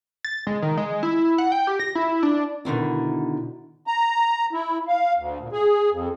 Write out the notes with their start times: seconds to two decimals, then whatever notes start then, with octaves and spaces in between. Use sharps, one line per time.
0.25 A6
0.47 G#3
0.62 D#3
0.77 G#3
1.03 E4
1.38 F#5
1.52 G5
1.67 G4
1.79 A#6
1.95 E4
2.23 D4
2.65 B2 D3 D#3 E4
3.87 A#5
4.53 E4
4.88 F5
5.17 D2
5.41 A#2
5.52 G#4
5.91 F2